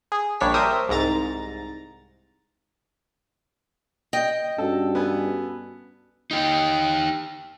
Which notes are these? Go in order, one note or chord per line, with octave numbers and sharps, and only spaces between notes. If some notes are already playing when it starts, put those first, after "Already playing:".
G#4
A#1 G3 D4 C#5 B6
G4 A#4 C5 E5 D#6
C2 G#2 A#5 A6
D#5 G5
G2 C#4 F#4 A4
B3 A4 G#5
D#4 G4